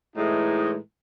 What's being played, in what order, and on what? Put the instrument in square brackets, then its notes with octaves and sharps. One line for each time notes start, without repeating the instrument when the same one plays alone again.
[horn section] A2 E3 G#3 A3 D#4